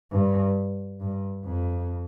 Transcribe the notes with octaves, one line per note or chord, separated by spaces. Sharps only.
G2
G2
F2